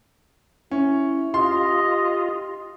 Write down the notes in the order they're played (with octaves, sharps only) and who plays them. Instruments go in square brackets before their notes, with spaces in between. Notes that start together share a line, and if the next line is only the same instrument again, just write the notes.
[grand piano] C#4 [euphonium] E4
[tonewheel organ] F4 [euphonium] G4 [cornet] D#5 [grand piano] C6